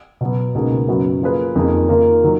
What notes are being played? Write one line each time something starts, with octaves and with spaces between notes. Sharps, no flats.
B2 F#3 B3
C#2 B2 A#3 D#4 G#4
F#2 C#3 F#3 B3 F#4
F3 A#3 F4 G#4 B4
F2 D#3 A#3 D#4 G#4
D#3 A#3 F4 A#4
D#3 F#3